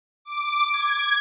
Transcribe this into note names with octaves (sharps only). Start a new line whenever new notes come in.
D6
G#6